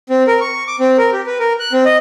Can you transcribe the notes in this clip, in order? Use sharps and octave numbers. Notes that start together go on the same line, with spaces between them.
C4
A#4
C#6
D6
C4
A#4
G4
B4
A#4
F#6
C4
D#5